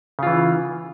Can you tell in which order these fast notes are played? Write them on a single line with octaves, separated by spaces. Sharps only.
C#3 F4 E3